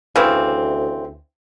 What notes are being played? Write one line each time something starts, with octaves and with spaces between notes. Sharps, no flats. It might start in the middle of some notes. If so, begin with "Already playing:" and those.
D2 C#3 E3 C4